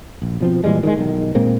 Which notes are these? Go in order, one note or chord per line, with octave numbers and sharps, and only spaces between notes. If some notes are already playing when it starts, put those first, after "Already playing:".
A#1
B2 F3 C4
A#2 E3 G3 G#3
D#3 F#3 G#3
B1 D#3
A#2 G#3 A#3 C4